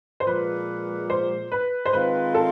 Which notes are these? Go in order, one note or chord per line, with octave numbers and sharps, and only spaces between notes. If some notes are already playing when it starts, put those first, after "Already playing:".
C5
A#2 F3 G#3 B4
C5
B4
C5
D#3 G#3 C4 F4 B4
A4